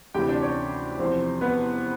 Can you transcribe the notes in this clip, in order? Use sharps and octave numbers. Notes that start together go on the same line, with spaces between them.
D2 C3 E3 G4 G5
D4 D5
C#4 C#5
E2 C3 F3 C4 C5
B3 B4